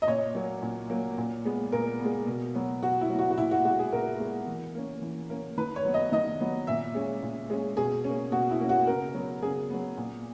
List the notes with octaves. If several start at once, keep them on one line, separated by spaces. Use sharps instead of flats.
D#5
A#2 C#5
F#3 A#3
A#2
F#3 A#3
A#2
G#3 B3
A#2 A#4
B3
G#3
B2
F#3 B3
B2 F#4
E4
F#3 B3
F#4
F#4
A#2 E4
F#4
G#3 B3 F#4
G#4
A#2 A#4
G#3 B3
E3
A#3 C#4
E3
A#3 C#4
D#3 B4
C#5
F#3 B3
D#5
D#3 D#5
F#3 B3
A#2 E5
G#3 C#4
A#2
G#3 C#4
B2 G#4
C#4
A#3
B2 F#4
E4
A#3 C#4
F#4
C#3 A#4
F#3 B3
C#3 G#4
F#3 B3
A#2